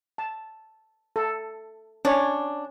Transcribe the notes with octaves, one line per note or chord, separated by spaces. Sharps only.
A5
A4
C#4 D4 C#5